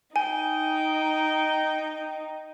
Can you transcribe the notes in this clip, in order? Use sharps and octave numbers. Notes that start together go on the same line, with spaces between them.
D#4 G5 G#5